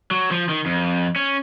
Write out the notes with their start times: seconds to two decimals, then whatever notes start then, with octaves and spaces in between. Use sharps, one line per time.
0.11 F#3
0.31 F3
0.49 D#3
0.66 F2
1.16 C#4